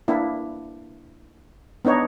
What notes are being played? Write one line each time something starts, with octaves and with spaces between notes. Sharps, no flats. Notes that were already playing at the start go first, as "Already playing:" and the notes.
A#3 D4 E4
B3 D4 D#4 C#5